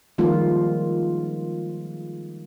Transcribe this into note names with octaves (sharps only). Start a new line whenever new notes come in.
D#3 F3 G3 G#3 A#3 F4